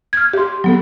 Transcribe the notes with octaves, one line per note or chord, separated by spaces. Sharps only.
F6 G#6
G4 C6
F#3 B3 A4